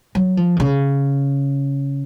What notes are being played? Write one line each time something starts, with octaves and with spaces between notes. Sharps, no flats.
F#3
F3
D#3
C#3